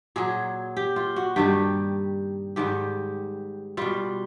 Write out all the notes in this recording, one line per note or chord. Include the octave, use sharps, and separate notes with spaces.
A#2 F#3 G#4
G4
F4
F#4
G2 D#3 G3 G4
G#2 D#3 G3 G4
B2 G3 F4